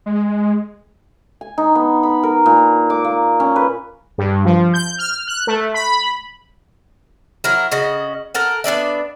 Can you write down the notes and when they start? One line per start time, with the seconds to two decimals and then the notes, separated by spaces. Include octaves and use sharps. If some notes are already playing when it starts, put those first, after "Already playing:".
0.06 G#3
1.41 G#5
1.58 D#4
1.75 B3
2.03 B5
2.23 A#4
2.46 A#2
2.90 D6
3.04 A#3
3.40 C#4
3.56 B4
4.18 G2
4.45 F3
4.74 G6
4.99 F6
5.27 F#6
5.47 A3
5.74 B5
7.44 F#3 E4 A#4
7.72 C#3 F#4 D#5
8.35 A4 A#4 F#5
8.64 B3 D4 D5 E5